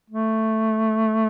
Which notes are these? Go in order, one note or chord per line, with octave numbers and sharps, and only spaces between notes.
A3